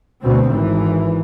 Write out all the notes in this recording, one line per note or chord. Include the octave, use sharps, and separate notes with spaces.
D2 B2 C4
G#1 E3